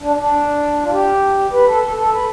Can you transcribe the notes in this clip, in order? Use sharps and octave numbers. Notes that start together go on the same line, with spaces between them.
D4
D4
F4
G4
B4
A4
A4
A4
B4